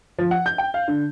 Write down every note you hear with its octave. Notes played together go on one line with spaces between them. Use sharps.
F3
F#5
G6
G5
F5
D3